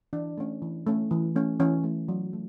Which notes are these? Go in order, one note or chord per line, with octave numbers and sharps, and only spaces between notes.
E3 D4
A3 C#4
E3
A3 C#4
E3
A3 C#4
E3 C#4
A3 C#4
F#3
A3